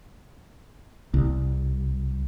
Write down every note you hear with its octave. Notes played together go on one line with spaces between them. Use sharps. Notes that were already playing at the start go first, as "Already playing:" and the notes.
C2